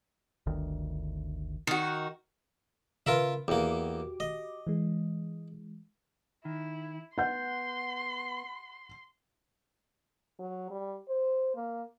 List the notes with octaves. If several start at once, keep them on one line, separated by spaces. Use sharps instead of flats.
G1 D2 D#3
D#3 F#4
C#3 F4 A#4 B4 E5
E2 A#3 F#4 G4 D6
D#5
E3 G#3
D#3 E4
B3 F#5 C6 G6
F#3
G3
C5
A#3